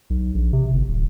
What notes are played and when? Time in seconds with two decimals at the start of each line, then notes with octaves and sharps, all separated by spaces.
0.10 B1
0.35 A#1
0.53 C3
0.73 G1
0.88 D1